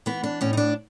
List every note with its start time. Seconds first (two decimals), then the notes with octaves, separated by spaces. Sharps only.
0.06 E3 B3
0.24 D4
0.41 A2 C#4
0.53 D#4
0.57 D4